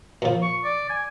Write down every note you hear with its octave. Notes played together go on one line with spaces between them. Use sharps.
A#2 F3
C#6
D5
G#5